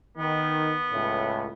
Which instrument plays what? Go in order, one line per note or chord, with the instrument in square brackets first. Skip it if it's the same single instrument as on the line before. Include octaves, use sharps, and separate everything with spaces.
[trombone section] D#3 [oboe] B3
[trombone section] C#2 A2